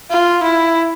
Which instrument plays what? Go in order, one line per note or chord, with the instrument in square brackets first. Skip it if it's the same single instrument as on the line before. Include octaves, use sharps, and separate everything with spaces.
[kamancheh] F4
E4